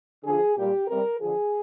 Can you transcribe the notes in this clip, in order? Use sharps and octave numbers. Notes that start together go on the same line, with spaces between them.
D3 F3 G#4
A#2 G3 G4
C3 G3 A#4
D3 F3 G#4